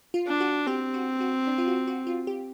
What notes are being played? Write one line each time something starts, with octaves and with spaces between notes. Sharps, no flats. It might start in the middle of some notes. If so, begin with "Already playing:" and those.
F4
D4
F#4
C4 G4
F#4
F#4
D4
F4
F#4
F#4
F4
G4